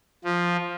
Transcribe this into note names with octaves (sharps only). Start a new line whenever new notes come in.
F3